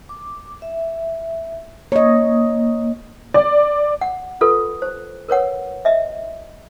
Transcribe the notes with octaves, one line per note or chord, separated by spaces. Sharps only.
D6
E5
A#3 C#5 D#5
D5
F#5
F4 A4 B4
C5
A#4 B4 C#5 F#5
D#5 E5